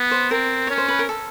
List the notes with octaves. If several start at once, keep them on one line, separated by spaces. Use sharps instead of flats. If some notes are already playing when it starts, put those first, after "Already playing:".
Already playing: B3
C5
C4 A#4
C#4 C#5
C5
B4
A#4
A4